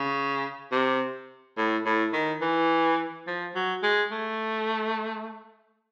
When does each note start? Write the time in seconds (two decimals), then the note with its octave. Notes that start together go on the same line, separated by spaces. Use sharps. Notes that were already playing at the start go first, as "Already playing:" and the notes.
Already playing: C#3
0.72 C3
1.57 A2
1.85 A2
2.13 D#3
2.41 E3
3.27 F3
3.55 F#3
3.83 G#3
4.12 A3